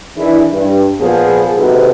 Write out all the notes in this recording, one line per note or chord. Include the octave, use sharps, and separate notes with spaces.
D#3 E3 D4 E4 G#4
G2
A#2 F3 B3 G#4
D#2 G#2 C3 F#4 A4 B4